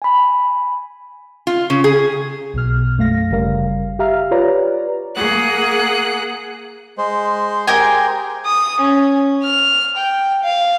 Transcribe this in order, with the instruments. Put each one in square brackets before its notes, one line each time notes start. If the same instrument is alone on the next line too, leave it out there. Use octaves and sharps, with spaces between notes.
[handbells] G#5 B5
[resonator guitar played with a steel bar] F4
C#3
G#4
[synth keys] B1 B2 F6
F#2 A3 F5 A#6
G1 C#3 G3 A#4 F5
G4 E5 F5 A#5 F6
F4 G4 B4 C#5 D5 A#5
[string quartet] A#3 G#4 F#5 F#6
[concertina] G#3 C5
[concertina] G4 G#4 C5 [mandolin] A#4 G5 G#5
[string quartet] D#6
C#4
F6
G5
F5